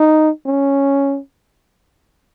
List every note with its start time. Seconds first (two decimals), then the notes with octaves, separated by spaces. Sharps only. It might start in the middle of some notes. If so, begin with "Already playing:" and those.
Already playing: D#4
0.46 C#4